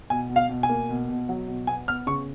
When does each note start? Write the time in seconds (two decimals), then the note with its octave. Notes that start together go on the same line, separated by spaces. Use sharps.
0.10 B2 G#5
0.30 B2
0.36 F5
0.49 B2
0.63 G#5
0.69 A#3
0.89 B2
1.09 B2
1.29 F#3
1.48 B2
1.67 B3 G#5
1.88 B3 F6
2.07 C#3 C#6